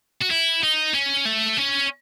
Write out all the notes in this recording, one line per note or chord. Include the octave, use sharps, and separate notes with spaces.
F#4
E4
D#4
C#4
A3
C#4